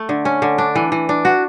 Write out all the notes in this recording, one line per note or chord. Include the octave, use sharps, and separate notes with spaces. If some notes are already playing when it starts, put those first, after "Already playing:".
Already playing: A3
D3
C#4
D3
D4
E3
E3
D4
F#4